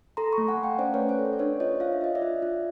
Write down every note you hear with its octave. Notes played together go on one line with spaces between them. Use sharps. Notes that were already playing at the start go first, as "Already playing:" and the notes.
A4 A#5 C6
B5 C#6
A3
F#5 G#5
A3
F5 G5
C#4 C5 D5
C#4 B4 C#5
C5
A4
C5
D5
D4 B4 C#5
F4 C#5 D#5
F4 F5
E5
F4 D#5
D5 E5
F4
F4